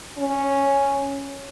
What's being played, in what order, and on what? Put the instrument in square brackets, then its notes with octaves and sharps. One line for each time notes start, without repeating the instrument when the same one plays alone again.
[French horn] C#4